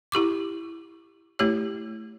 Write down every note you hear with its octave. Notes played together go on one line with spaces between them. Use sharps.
E4 G4 C#6 D6
A3 E4 G4 C#5